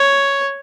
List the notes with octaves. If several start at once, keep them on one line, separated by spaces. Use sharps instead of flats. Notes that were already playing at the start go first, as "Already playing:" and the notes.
Already playing: C#5